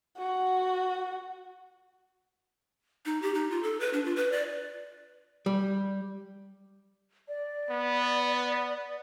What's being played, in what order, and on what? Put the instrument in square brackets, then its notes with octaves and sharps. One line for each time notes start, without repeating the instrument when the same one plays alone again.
[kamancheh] F#4
[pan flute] D#4
G4
D#4
F4
A4
B4
D4
F4
B4
D5
[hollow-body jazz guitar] G3
[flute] D5
[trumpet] B3